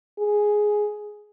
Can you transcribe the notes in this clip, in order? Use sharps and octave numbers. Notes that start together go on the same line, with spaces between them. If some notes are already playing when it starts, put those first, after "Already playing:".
G#4